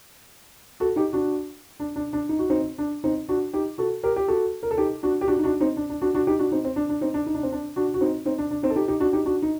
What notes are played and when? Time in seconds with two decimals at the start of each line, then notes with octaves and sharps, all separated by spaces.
0.80 F#4 A4
0.96 D#4 G4
1.13 D4 F#4
1.80 D4
1.96 D4
2.13 D4
2.29 D#4
2.39 F#4
2.50 C4 D#4
2.78 D4
3.04 C4 D#4
3.29 D4 F#4
3.54 D#4 G4
3.78 F#4 A4
4.03 G4 A#4
4.16 G4
4.28 F#4 A4
4.63 A#4
4.71 A4
4.78 D#4 G4
5.03 D4 F#4
5.21 G4
5.28 D4 F#4
5.38 D#4
5.44 D4 F#4
5.60 C4 D#4
5.77 D4
5.89 D4
6.02 D4 F#4
6.15 D4 F#4
6.27 D#4 G4
6.39 D4 F#4
6.52 C4 D#4
6.64 C4
6.76 D4
6.89 D4
7.01 C4 D#4
7.14 D4
7.27 D#4
7.34 D4
7.43 C4
7.52 D4
7.76 D4 F#4
7.94 F#4
8.01 C4 D#4
8.26 C4 D#4
8.38 D4
8.51 D4
8.63 C4 D#4
8.70 A4
8.75 D#4 G4
8.88 D#4 G4
9.00 D4 F#4
9.13 D#4 G4
9.25 D4 F#4
9.43 D#4